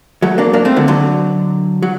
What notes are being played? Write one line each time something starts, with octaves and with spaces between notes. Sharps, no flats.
F#3 A3
A#3 D4
A#3 D4
A3 C4
D3 F#3
D3 F#3
F#3